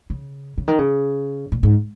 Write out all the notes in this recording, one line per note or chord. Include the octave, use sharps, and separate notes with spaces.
C#3
C#3
D#3
C#3
A#2
G#2